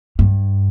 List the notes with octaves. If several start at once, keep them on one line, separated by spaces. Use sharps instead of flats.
G2